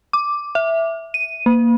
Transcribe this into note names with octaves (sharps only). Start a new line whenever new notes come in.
D6
E5
D#7
A#3